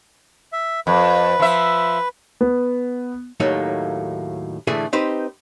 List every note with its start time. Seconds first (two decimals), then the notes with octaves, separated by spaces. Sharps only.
0.53 E5
0.87 F2 B4
1.40 F3 E5
2.41 B3
3.40 D#2 A2 F#3 A3 A#3 D#4
4.67 A2 D3 E3 A3 G#4
4.93 C4 D#4 G4 B4 C5